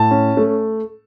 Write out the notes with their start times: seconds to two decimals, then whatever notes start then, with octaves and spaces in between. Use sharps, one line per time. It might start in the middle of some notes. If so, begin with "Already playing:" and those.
Already playing: A2 A5
0.11 C#4
0.37 A3